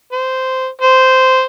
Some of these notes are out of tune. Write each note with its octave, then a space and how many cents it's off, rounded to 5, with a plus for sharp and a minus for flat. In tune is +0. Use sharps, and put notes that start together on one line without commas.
C5 -10
C5 -10